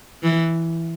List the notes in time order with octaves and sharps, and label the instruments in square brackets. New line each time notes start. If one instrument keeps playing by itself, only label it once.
[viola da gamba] E3